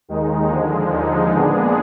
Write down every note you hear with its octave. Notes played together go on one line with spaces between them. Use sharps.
D#2 D#3 G#3 D#4
D3 F3 G#3
D#2 D3 F3 G#3 D#4
A#2 G#3 B3 D4 G#4